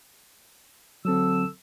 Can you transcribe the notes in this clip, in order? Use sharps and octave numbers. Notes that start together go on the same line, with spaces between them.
D3 F#3 C4 A4 E6